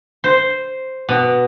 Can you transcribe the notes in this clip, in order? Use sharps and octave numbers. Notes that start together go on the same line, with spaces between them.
C5
B2